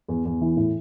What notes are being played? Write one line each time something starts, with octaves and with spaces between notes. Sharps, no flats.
E2
E2
E3
A2